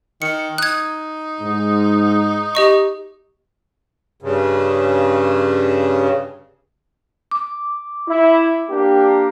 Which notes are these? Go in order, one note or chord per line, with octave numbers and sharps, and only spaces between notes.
D#3 C#7
D#4 F#6 G#6
G#2
G4 D#5 C#6
G2 C#3
D6
E4
A#3 D4 G4